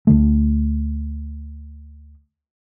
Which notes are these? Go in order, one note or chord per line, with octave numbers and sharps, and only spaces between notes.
D2 D3 A3